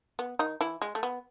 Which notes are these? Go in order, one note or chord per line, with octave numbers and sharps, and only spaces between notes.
B3
D#3 D#4
E3 E4
G#3
A3
B3